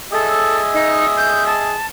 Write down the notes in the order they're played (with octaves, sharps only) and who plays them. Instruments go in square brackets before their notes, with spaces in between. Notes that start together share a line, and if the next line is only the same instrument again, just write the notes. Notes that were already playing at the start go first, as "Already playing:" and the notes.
[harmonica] G#4 D#5 E5 [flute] A4
[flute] D#4
G6
A5